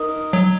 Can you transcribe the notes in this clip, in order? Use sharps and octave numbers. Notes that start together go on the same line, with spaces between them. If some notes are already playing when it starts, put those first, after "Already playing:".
Already playing: D#4 A#4 D#5
F#3